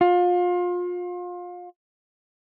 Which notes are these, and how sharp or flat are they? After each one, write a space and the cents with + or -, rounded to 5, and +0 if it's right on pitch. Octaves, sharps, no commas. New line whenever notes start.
F4 +30